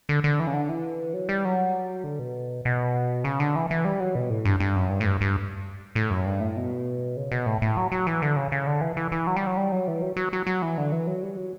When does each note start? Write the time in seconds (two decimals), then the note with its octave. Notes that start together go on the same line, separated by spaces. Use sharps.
0.09 D3
0.24 D3
0.40 E3
0.47 C#3
0.53 D3
0.69 E3
1.14 F#3
1.29 G3
1.45 F#3
2.04 D3
2.19 B2
2.65 B2
3.24 C#3
3.40 D3
3.56 E3
3.71 E3
3.85 G3
4.00 F#3
4.15 B2
4.30 A2
4.45 G2
4.60 G2
4.76 F#2
4.90 G2
5.00 A2
5.06 G2
5.21 G2
5.95 A2
6.10 F#2
6.26 G2
6.40 A2
6.56 B2
7.17 C#3
7.32 B2
7.46 A2
7.62 A2
7.77 F#3
7.92 F#3
8.07 E3
8.22 D3
8.36 C#3
8.52 C#3
8.67 D3
8.81 E3
8.97 E3
9.12 E3
9.27 F#3
9.37 G3
9.47 F#3
9.57 G3
9.72 F#3
9.88 E3
10.02 F#3
10.17 F#3
10.33 F#3
10.47 F#3
10.62 E3
10.78 D3
10.92 E3
11.07 F#3
11.23 G3
11.37 F#3